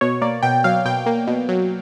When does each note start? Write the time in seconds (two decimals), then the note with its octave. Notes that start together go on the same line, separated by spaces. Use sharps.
0.01 B2 C#5
0.22 A#3 D5
0.43 B2 G5
0.64 F#3 F5
0.85 B2 G5
1.06 A#3
1.27 B2
1.49 F#3